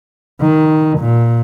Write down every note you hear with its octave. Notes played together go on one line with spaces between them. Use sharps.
D#3
A#2